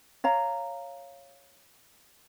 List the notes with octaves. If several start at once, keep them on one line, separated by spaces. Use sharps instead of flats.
C#5 F5 A#5